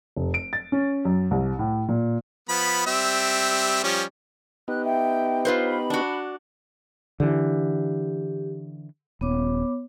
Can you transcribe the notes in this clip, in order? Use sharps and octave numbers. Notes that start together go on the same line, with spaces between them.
F1
D7
A6
C#4
F#2
C2
A2
A#2
F3 B3 B5
G3 C4 E5
F3 G3 C#4
B3 D#4 G4 F#6
E5 G5
F4 B4 C5
B5
D4 F#4
D3 E3 G4
D#1 B3 C#5 D6